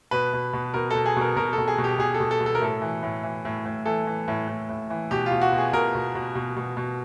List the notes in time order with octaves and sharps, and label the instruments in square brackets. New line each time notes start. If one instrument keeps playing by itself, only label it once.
[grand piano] B2 B4
B2
B2
B2 A#4
B2 A4
G#4
B2 A#4
B2 A#4
A4
B2
G#4
B2
G4
B2 G#4
A4
B2
A4
B2
A4
A#4
A2 A4
E3
A2
E3
A2
A2
E3 A4
E3
A2
A2
A2
E3
B2 G4
F4
B2
F#4
B2
G#4
B2 A#4
B2
B2
B2
B2
B2